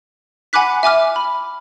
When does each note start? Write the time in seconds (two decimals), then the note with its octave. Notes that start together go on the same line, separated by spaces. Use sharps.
0.53 F#5 G#5 B5 D6 F#6 B6
0.83 E5 G#5 D6 F6
1.16 B5